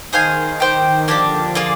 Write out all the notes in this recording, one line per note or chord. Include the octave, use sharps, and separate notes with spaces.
D#3 G#4 C5 F5 G#5
G4 C5 G5
D3 F3 A#3 D4 G4 D5
A#3 F4 G#4 D5